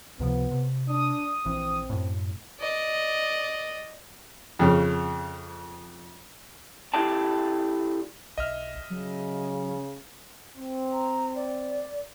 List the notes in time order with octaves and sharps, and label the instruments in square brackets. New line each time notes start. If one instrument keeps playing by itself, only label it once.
[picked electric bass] C#2 C3 F3 [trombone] B3
[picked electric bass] C3
[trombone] D4 [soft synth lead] D#6
[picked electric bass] A#1 E3 [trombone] C4
[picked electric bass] F#2 A2
[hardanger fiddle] D5 D#5
[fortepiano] F2 C#3
[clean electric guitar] E4 G4 A4 D5 G5 A5
[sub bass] B1 [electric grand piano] D#5 E5 F6
[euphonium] C#3 [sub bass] F#3
[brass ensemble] C4
[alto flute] A#5
D5